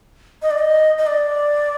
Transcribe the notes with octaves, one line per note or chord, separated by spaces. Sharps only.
D#5
D5
D#5
D#5
D5